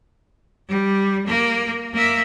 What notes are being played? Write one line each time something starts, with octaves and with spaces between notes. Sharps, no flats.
G3
A#3
A#3 E5